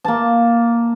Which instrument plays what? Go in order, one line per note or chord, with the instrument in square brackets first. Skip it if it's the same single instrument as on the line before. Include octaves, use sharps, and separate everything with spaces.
[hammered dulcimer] A#3 A5